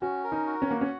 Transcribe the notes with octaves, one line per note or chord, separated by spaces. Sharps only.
C#4 F#4
A#4
D#4
F#4
C#4
A#3 F#5
C#4